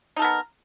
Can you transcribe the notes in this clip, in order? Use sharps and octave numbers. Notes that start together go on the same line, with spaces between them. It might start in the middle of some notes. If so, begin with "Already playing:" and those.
B3 D#4 A4 A#4